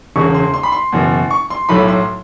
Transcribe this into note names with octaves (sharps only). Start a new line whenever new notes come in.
E1 E2 C#3 C#6
C6
C6
B5
C6
F#1 E2 B2
C#6
C6
B1 A2 F#3 A3 B5
C6